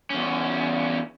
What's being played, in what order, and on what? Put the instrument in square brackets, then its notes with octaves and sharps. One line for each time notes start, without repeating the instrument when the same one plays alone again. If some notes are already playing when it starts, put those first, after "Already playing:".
[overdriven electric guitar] E2 C#4